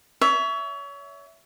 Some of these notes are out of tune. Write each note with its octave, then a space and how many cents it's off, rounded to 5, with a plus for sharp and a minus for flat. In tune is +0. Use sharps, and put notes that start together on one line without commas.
C#5 +30 E5 +0